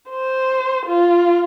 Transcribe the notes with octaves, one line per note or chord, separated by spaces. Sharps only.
C5
F4